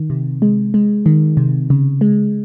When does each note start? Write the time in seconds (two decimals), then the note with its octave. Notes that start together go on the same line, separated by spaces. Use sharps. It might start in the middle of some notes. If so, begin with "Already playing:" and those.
Already playing: D#3
0.10 C3
0.42 G#3
0.74 G#3
1.06 D#3
1.37 C3
1.70 C#3
2.01 G#3